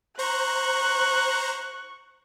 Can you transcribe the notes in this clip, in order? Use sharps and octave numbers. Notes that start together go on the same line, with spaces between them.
C5 A#5 C#6 F#6